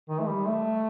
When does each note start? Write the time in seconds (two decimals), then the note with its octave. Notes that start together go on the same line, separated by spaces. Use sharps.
0.09 D#3
0.20 A3
0.28 G3
0.47 A3